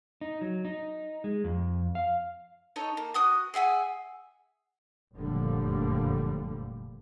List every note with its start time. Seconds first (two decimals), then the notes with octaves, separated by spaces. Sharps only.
0.21 D#4
0.41 F#3
0.65 D#4
1.24 G#3
1.44 F2
1.95 F5
2.76 D#4 A4 C#5 D#5
2.97 A#3
3.14 F#4 D#6 F#6
3.54 G#4 E5 F#5 G#5
5.15 F1 F#2 A#2 D3 F3 G3